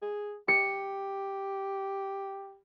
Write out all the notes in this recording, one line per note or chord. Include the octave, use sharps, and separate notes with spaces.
G#4
G4 C#7